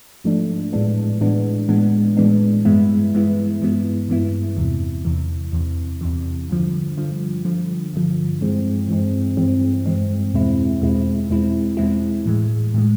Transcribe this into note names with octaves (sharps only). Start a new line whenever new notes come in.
G#2 F3 A3 D4
A2 E3 G#3 B3 D4
A2 E3 G#3 B3 D4
A2 E3 G#3 B3 D4
A2 E3 G#3 B3 D4
G2 E3 G#3 B3 E4
G2 E3 G#3 B3 E4
G2 E3 G#3 B3 E4
G2 E3 G#3 B3 E4
E2 C3 E3
E2 C3 E3
E2 C3 E3
E2 C3 E3
G2 D3 F3
G2 D3 F3
G2 D3 F3
G2 D3 F3
G2 E3 G#3 C4
G2 E3 G#3 C4
G2 E3 G#3 C4
G2 E3 G#3 C4
E2 B2 G#3 C4 E4
E2 B2 G#3 C4 E4
E2 B2 G#3 C4 E4
E2 B2 G#3 C4 E4
A2 E3 G#3
A2 E3 G#3